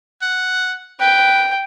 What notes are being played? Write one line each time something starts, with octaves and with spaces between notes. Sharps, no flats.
F#5
B4 G5